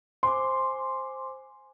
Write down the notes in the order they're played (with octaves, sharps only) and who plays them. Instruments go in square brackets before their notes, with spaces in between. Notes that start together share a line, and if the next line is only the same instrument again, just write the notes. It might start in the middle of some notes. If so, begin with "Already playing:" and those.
[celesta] C5 G#5 D6 [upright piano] C6